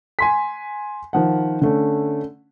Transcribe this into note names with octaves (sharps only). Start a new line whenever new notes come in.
G#5 C6 B6
D#3 F3 F#5
D3 A3 C#4